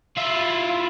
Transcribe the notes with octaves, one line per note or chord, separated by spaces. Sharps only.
E4 F4